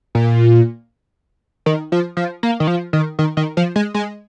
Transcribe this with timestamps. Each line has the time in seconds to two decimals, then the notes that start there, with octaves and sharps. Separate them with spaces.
0.15 A#2
1.66 D#3
1.92 F3
2.17 F3
2.43 A#3
2.60 D#3
2.67 F3
2.93 D#3
3.19 D#3
3.37 D#3
3.57 F3
3.76 G#3
3.94 G#3